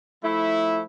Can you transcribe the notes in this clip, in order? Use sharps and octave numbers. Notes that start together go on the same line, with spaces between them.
F3 A3 E4